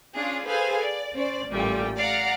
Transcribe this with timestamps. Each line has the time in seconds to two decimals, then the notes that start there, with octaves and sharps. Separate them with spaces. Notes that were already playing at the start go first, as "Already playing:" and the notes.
0.15 C#4 D4 F4 G#4
0.47 G#4 A4 B4 C5 F5 G#5
0.81 D5
1.15 C#4 C5 D5
1.51 A1 A#2 G3 A3 G5
1.97 D5 F5 F#5 A#5